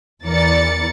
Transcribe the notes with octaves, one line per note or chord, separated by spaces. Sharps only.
E2 E3 A#4 D5 A6 C#7